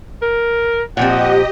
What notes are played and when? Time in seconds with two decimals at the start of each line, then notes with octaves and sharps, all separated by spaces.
0.22 A#4
0.97 A#2 F3 C4 G4 D#5 F#5